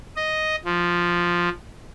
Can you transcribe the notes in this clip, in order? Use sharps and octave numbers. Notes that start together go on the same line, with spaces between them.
D#5
F3